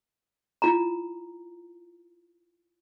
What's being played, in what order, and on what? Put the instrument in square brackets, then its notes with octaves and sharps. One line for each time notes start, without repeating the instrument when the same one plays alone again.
[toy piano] E4 F4 A#5